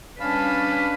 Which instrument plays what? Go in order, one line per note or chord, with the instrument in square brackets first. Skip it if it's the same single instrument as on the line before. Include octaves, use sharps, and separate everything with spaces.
[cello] G3 B4 [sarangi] C#4 [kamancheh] D4 [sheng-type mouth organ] F5 A5 B5